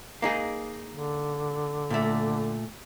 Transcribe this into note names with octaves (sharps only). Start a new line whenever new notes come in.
A#3 D#4 G#4
D3
A#2 A3